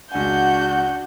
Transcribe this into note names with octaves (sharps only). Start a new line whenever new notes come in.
C#2 D4 F#4 F#5 G#5 G6